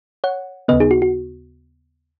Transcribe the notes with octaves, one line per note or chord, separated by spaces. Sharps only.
C#5 F#5
D#2 C#3 B3 B4 D#5
D#4 G#4
F#4
F#4